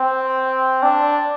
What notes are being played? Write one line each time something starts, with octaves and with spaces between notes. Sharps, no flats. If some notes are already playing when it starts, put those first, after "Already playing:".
Already playing: C4
D4